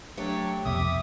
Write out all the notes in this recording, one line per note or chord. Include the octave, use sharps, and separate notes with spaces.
F#3 A3 D4 G4 C#6
C2 F2 B2 E5 D6 D#6